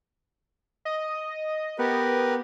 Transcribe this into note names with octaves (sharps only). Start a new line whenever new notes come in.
D#5
B3 G4 A#4 B4